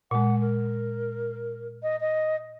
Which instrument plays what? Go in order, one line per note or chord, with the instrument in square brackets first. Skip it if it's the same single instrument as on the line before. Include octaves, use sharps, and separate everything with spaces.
[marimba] A#2 G#3 [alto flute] F#5
[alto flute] A#4
D#5
D#5